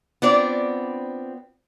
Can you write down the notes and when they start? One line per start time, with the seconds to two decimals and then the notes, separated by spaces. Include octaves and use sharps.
0.22 B3 C4 D4 F4 D5